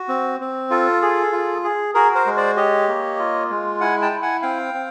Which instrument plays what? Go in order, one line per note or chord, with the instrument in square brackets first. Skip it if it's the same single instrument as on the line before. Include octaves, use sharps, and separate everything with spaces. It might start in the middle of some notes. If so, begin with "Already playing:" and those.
Already playing: [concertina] F#4
C4
C4
F4 A4
G#4
F4
G#4
F#4 G#4 A#4
A#4 C5
G#3
C5 D5
G4 C#5 D#5
A#3
F4
G#3
E4 F#5 G#5
G5 A5
E4
F#5 G#5
C4 F5 G5
C4